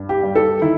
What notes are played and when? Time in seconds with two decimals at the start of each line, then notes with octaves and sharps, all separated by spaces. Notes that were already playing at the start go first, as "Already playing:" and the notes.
Already playing: G2
0.09 G4
0.23 G3
0.35 A4
0.61 D#3 E4